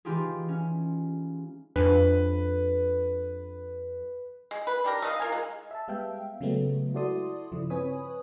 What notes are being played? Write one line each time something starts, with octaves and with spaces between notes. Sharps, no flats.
E3 G#3 D#4 F4 G4 G#4
C#4
F2 D4 B4
G#3
B4
D4 G4 A#4
A3 D#5 F5
F4 A#4 G#5
G#3
E5 A5
G3 G#3 B3 E5 F5 G5
C#3 F#3 G#3 A3 B3
E4 F#4 A4 D5 C6 D#6
G2 C#3 F3 E4
C4 B4 C#5 G#5 B5 D#6